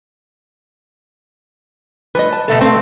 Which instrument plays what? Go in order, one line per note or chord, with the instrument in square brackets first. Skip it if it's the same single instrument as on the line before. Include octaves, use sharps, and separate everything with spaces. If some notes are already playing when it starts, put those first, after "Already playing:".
[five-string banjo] F3 A3 D#5 [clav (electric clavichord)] B4
[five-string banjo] A5
[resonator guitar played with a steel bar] B2 A3 A4
[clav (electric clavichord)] A3 [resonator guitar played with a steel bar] C4 [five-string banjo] C5 F5